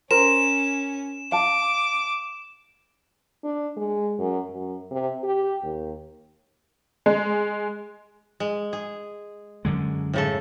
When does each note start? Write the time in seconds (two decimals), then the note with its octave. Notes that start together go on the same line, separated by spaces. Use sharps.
0.11 C#4 A#4 C5 E7
1.32 F5 A5 D6
3.44 D4
3.77 G#3
4.19 F#2
4.51 F#2
4.91 C3
5.24 G4
5.63 D#2
7.06 G#3
8.40 G#3
8.73 G#4
9.65 F#2 D3 G#3
10.14 A2 C#3 A4